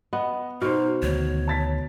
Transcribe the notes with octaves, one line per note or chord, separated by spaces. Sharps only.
B3 D#5 F#5
B2 D#4 C5 F6
D2 D#3 G#3 C#5
A5 A6 B6